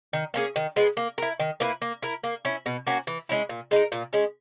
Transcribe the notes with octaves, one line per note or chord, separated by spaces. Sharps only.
D#3
A#3 C#4 G#4
D#3
G#3 B3
A#3
E4 A#4
D#3
A#3 E4 B4
A#3
E4 A#4
A#3
C#4 E4
B2
A#3 C#4 F#4
E3
G#3 C#4 E4
A#2
G#3 D#4 A#4
A#2
G#3 C#4